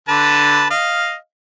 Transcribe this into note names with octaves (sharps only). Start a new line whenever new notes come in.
D3 B4 A5
D#5 F5